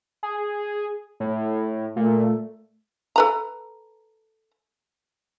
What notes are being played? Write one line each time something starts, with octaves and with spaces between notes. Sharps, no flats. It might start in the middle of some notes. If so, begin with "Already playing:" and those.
G#4
A2
A#2 A3
A4 B4 A#5